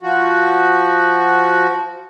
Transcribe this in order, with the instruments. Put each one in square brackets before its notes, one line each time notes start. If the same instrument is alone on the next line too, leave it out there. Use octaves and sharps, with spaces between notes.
[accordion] F3 F#4